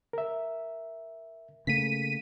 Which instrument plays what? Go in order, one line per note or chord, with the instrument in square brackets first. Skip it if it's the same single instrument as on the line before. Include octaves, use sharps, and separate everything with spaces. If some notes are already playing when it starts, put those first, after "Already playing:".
[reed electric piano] A#4 E5
[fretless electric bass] C#3 A3 A#3 [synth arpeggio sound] B6 D#7